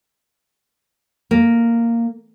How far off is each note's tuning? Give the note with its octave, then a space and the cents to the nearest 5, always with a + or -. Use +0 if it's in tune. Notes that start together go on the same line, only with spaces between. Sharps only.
A#3 -5